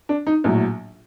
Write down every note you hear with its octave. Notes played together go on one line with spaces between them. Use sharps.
D4
D#4
A#1 A2 F#3